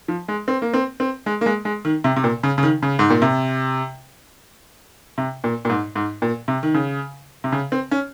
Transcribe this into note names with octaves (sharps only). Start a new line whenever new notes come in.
F3
G#3
C4
A#3
C4
C4
G#3
A#3
G#3
G#3
D#3
C3
C3
A#2
C#3
C#3
D#3
C#3
G#2
A#2
C3
C3
A#2
A#2
G#2
G#2
A#2
C3
D#3
C#3
C3
C#3
C4
C#4